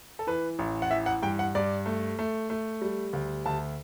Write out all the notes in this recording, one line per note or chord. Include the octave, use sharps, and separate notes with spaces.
A4
E3 B4
A1
F#5
E3 E5
F#5
G2 G5
F#5
G2 D5
A3
A3
A3
G3
D2
D2 A5